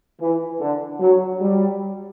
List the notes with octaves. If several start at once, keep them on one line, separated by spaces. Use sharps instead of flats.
E3
D3
F#3
G3